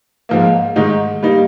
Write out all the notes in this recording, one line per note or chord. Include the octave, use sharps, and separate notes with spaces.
G#2 F3 A#3
G#2 D#3 G#3 D#4
G3 A#3 D#4